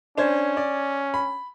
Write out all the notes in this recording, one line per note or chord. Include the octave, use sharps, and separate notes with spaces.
C#4 D4 C5 G#6
D5
B5